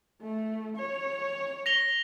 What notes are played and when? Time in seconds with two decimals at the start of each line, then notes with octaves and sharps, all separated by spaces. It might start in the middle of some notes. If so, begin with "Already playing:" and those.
0.21 A3
0.77 C#5
1.66 A#6 F7 G7